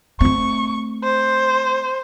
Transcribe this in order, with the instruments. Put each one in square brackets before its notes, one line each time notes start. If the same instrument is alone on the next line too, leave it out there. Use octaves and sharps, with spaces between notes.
[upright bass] A3 C4 [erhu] C#6
[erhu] C5